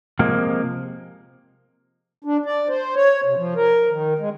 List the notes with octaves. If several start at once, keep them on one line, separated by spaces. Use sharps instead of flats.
C3 F3 G#3 A#3
D4
D5
C5
C#5
C3
F3
A#4
D#3
G#3